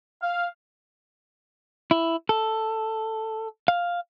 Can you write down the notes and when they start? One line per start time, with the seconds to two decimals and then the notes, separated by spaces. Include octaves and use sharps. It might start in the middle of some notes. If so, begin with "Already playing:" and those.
0.20 F5
1.91 E4
2.29 A4
3.68 F5